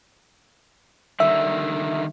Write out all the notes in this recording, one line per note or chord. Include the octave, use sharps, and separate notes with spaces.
D3 D#3 G3 E5